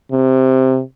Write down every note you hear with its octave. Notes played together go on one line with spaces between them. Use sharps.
C3